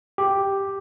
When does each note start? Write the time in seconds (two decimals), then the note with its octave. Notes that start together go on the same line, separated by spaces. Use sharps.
0.18 G4